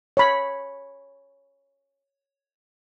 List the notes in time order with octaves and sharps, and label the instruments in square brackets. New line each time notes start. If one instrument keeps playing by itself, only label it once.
[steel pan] C#5 B5